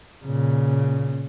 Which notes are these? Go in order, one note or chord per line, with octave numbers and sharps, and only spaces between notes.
A#2 C#3